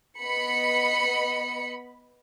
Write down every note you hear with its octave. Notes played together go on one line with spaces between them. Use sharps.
B3 D#5 B5 C#7